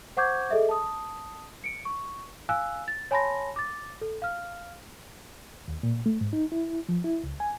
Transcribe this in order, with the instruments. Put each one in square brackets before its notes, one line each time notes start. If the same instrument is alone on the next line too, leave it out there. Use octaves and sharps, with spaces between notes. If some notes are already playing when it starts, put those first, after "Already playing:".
[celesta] C5 F#5 C#6 D6 G6 G#6
G#4 A4 D#5 E5
A5 D#6
C#7 D7
C#6
F5 G#5 E6 F#6
A6
C#5 G#5 A5 B5 C6 A#6
D6 A6
A4
F5 F6
[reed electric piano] D#2
A#2
A3
G#2
D#4
E4
F3
E4
C#2
G#5